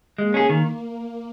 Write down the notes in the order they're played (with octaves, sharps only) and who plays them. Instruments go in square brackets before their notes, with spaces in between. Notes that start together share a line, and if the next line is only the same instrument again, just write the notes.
[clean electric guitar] G#3 [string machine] A#3
[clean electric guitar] C#4 G#4
D#3